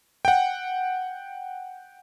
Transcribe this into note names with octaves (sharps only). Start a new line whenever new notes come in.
F#5 G5